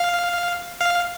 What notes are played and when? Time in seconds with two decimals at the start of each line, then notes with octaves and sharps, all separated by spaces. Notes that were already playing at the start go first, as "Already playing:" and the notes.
Already playing: F5
0.81 F5